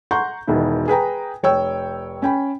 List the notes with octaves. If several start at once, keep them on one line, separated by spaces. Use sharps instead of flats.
F#5 A#5 C6 C#6 G6
E1 B2 D#3 E4
G#4 B4 G5 A#5
F1 C#5 G5 E6
C#4 G5 B5